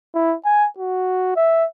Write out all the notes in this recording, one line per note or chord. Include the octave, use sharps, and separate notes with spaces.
E4
G#5
F#4
E5